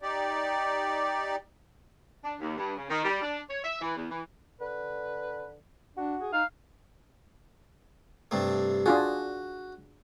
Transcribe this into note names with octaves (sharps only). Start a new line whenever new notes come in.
D#4 G4 D5
D4
D#2
G2
C#3
D#3
G3
D4
C#5
E5
E3
E2
E3
D3 B4
D4 F#4
G#4
D#4 F5
G2 C3 A3
D4 F4 F#4 G#4